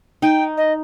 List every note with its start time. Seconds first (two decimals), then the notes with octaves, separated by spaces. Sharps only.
0.22 D#4 G5
0.57 D#5